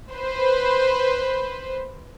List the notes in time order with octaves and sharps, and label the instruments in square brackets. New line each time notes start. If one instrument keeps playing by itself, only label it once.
[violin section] B4 C5